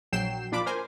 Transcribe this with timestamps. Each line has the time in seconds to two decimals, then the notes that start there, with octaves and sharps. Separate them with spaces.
0.12 A#1 F#3 G5 C7 E7
0.52 A#1 A#2 D4 F4 B5 D6
0.66 A#4 C5 G#5